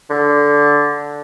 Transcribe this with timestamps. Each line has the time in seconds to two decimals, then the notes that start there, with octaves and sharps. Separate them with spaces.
0.10 D3